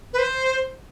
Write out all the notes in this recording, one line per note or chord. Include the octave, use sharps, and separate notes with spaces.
B4
C5